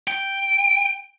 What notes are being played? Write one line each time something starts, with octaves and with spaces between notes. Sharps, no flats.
G5